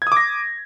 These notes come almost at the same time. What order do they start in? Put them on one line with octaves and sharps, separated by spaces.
G#6 D#6 D6 A#6